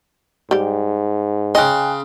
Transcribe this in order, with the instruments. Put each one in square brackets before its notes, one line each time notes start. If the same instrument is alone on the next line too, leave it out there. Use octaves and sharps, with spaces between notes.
[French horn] G#2 [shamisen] G3 G4
[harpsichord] C#3 C6 [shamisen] D#5 [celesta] G5 G#5 F#6